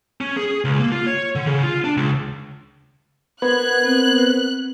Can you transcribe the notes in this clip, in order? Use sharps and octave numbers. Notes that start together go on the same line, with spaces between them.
C#4
G#4
C#2
A#3
F4
C#5
D3
C#3
F4
D4
C#2
B3 A#4 C5 F#6 G#6
C4